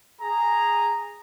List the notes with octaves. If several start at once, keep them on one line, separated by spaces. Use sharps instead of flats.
G#4 A#5